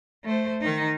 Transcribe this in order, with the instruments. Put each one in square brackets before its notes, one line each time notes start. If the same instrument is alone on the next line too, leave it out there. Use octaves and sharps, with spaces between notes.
[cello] A3 C5
D#3 D#4